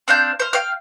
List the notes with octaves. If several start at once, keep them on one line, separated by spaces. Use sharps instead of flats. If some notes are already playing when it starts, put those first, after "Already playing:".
C4 D4 F5 G6
C5 F5
F5 G5 F6